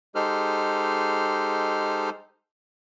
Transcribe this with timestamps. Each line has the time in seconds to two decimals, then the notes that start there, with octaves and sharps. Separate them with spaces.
0.15 G#3 D#4 G4 A4 C5 F6